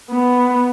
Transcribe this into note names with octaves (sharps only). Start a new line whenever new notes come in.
B3